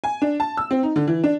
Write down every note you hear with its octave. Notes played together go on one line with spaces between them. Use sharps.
G#5
D4
A5
E6
C4
D#4
D3
E3
D4